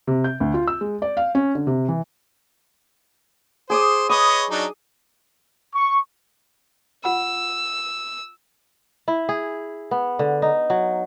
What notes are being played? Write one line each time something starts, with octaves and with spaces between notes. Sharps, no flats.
C3
G6
D2
F4
E6
G#3
D5
F5
C#4
D3
C3
E3
G#4 C5 D6 D#6
B4 C#5 D#5 D#6
F#3 D4 D#4
C#6
F4 F#5 B5 E6
E4
G#4
B3
D3
D#4
F#3